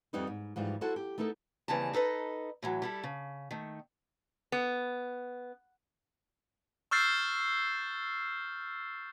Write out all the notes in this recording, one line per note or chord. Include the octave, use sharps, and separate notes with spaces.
F2 G3 B3 D#4 E4 B4
G#2
G#2 E3 F3 G3
E4 F#4 A4 C5 A5
G4
A3 B3 D#4 E4 A4 A#4
D#2 C#3 E3 G3 C4 A5
D#4 A4 B4 D#5
A2 E3 F#3
G3 E4 A4
C#3
D#3 A3
B3
C#6 E6 F6 G6 A6 C7